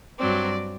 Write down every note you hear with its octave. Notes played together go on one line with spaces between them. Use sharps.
G2 F#3 C4 D5